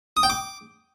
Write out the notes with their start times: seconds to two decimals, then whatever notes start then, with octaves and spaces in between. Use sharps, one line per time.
0.17 D#6
0.23 G5
0.30 D6